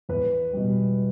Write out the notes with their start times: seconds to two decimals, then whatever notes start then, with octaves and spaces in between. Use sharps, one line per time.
0.09 E2 B4
0.53 B2 G3